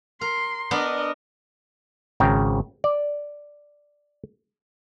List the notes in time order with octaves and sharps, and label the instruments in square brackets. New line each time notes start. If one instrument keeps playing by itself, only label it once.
[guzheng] A#4 [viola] C6
[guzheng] B3 D4 [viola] A#4 D#5
[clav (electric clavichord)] G#1 C#3 G5 A#5
D5